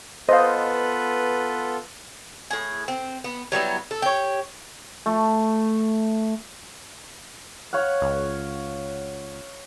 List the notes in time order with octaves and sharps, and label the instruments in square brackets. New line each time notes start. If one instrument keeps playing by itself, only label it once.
[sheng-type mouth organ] B3 F4 A4 [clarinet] B4 [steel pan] C5 [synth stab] D#5 F5
[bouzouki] A2 G#4
C4
B3
F#3 G3 B3 E4
A4
G4 C#5
[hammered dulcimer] A3
C#5 F5 F#5
[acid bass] C#2